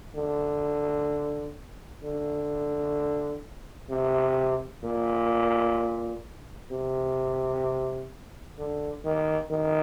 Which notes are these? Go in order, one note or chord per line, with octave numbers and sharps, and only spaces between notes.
D3
D3
C3
A#2
C3
D3
D#3
D#3